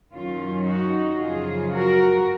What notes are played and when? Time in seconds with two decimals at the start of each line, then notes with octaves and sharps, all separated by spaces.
0.12 F#2 D#3 F#3 C#4 F4
0.65 D#4 F#4
1.19 F#2 C#3 F3 F4 G#4
1.73 F#4 A#4